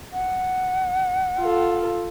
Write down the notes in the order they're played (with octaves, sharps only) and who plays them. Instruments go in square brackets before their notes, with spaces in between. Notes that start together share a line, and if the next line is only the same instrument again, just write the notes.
[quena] F#5
[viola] F4 A4